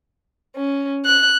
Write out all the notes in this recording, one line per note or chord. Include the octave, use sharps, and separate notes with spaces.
C#4
F#6